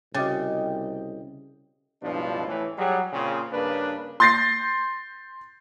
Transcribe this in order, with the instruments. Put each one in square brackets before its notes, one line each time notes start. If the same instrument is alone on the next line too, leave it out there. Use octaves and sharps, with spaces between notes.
[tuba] C2 [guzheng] C#3 [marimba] F#4 D6 A6 [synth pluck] D#5 G5
[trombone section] C#2 G2 B2 F3 D4 E4
A2 E3
F#3 G3 G#4
A#2 C#3 C4
G2 C#3 A#3 D4 B4
[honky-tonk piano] C6 G6 A6 A#6 C7